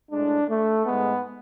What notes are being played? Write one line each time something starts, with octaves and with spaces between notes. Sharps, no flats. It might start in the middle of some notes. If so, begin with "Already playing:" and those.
A2 G#3 D4
A3
G#2 G#3 B3